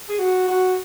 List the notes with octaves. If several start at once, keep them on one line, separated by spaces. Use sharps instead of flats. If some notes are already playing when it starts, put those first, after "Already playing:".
G#4
F#4
F#4